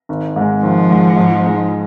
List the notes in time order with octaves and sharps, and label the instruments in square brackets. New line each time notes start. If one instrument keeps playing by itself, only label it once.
[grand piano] G#1
G#2 G#3
[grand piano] G#1 [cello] F3
[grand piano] G#2 G#3
G#2
G#3 D#4